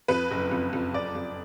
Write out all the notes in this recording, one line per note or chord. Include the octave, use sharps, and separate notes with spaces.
F2 B4
F#1
F2
F2
F#1 D5
F2